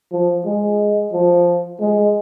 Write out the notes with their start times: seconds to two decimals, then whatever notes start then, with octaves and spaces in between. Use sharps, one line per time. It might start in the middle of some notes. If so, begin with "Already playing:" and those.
0.13 F3
0.46 G#3
1.13 F3
1.80 G#3